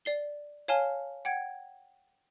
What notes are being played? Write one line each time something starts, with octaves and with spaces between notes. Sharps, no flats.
D5 C7 G7
C#5 F5 G#5 A5 F6 G7
F#5 G5 G#6